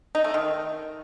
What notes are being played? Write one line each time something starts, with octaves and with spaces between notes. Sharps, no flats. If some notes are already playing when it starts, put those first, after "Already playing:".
D#4
A3
D#3